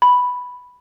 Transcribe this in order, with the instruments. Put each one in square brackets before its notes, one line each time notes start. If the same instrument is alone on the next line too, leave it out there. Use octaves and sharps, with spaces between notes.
[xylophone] B5